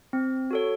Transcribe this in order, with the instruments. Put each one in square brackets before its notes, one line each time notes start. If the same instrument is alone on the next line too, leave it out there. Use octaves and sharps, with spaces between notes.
[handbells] C4
F#4 A4 C#5